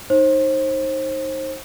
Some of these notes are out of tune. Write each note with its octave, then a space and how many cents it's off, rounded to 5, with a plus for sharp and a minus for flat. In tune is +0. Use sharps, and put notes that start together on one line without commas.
D#4 +0 C5 +35